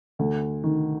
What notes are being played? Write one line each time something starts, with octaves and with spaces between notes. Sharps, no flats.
D2
D#3